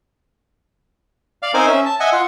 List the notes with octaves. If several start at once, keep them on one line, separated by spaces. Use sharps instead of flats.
D5 F5
C4 D#4 A#4 C5 G#5
C#4 E5
A5
D#5 E5 F#5 G#5
F4 F#5